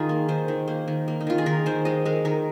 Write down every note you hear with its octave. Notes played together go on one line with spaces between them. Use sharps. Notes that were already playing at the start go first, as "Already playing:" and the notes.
Already playing: D#3 D#4 F4 G#4
A#3
D#3 C5
D#3
A#3 C5
D#3
A#3
D#4
D#3 F4
G#4
D#3 A#4
D#3 C5
G#3 D#5
G#3 A#4
D#3 A#4